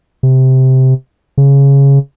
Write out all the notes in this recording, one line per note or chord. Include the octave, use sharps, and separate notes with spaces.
C3
C#3